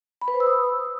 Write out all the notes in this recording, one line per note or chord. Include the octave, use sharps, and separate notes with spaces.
B5
B4
C5
E6
D#6